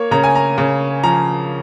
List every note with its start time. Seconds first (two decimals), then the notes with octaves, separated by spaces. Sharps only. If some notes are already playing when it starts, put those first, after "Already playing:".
Already playing: A#3 C#5
0.11 C#3 A#5
0.24 G#5
0.35 A#5
0.58 C#3
1.04 F3 A#5